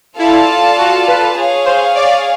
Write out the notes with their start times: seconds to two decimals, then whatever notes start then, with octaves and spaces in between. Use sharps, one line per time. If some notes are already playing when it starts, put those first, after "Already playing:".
0.19 E4 F4 A4 D5 F5 A5
0.78 F#4
1.08 B4
1.36 G#4 C#5 F5
1.65 C5
1.95 D5